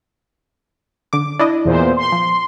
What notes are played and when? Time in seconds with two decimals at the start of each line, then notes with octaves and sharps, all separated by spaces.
1.13 D3 D6
1.39 D4 E4 D#5
1.65 E2 A#2 C5
1.97 C6
2.12 F3